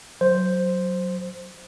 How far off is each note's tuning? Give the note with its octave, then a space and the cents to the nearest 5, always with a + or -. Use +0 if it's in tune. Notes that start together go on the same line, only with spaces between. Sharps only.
F#3 +0 C5 +0